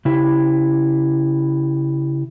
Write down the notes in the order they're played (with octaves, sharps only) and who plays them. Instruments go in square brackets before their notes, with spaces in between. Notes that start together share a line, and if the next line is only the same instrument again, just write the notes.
[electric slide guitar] C#3 E4 G4